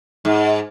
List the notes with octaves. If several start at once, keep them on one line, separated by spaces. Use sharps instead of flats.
G#2